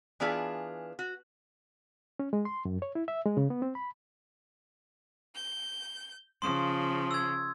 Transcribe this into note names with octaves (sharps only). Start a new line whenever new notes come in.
E3 B3 D4 F4 G#4
F#4
C#4
G#3
C6
F#2
C#5
E4
E5
G#3
C#3
B3
C4
B5
G6
C#3 F3 C6 D#6
E6 G#6